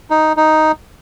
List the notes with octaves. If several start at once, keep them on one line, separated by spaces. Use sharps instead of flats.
D#4
D#4